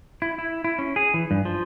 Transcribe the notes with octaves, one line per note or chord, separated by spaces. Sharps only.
E4
E4
E4
C#4
G#4
E3
G2
F3